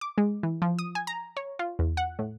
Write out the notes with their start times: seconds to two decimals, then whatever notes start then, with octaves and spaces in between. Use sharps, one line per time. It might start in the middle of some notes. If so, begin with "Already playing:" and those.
0.01 D6
0.18 G#3
0.43 E3
0.62 F3
0.79 D#6
0.95 G#5
1.07 A#5
1.37 C#5
1.59 F4
1.79 E2
1.97 F#5
2.19 A2